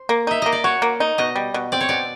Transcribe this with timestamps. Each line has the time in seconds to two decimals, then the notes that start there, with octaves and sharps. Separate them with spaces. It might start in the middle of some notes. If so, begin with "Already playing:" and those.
Already playing: C5
0.09 A#3
0.27 D#4 E5
0.42 A#3 D#5
0.52 D5
0.64 F#4 C#5
0.82 A#3
1.00 D#4
1.18 B2 D#5
1.36 G3
1.54 B2
1.72 C4 D5
1.81 C#5
1.89 B2 D5